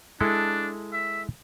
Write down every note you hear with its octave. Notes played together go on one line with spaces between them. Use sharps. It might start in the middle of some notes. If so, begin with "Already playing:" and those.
G#3 D4 E4 A4
E5